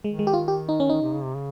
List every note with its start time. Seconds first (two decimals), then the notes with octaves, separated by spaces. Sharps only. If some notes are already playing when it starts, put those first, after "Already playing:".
0.04 D#3 G#3
0.19 G#3
0.27 G4
0.34 F4
0.48 G4
0.69 D#4
0.80 C#4
0.90 D#3 D#4
1.01 C3
1.12 C#3
1.23 C3
1.34 C#3